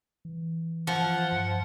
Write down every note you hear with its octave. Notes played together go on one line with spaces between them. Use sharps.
E3
F3 F#5
G2